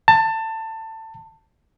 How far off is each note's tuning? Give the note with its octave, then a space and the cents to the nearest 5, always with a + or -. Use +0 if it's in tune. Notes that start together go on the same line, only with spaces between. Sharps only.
A5 +20